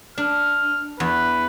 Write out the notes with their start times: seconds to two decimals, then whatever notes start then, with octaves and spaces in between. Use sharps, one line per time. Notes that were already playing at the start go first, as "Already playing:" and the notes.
0.18 D4 F6
1.00 E2 B4